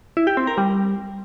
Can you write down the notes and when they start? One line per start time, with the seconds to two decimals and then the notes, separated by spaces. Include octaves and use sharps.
0.17 E4
0.27 G4
0.37 C4
0.47 A#4
0.58 G3